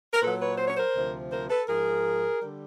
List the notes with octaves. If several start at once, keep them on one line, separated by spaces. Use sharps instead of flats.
A#4
A#2 F#3 A4 B4
B4 C#5
C5
C#5
A#4 C5
D2 C3 F3
A#4 C5
A4 B4
G#2 F3 G#4 A#4
D3 G3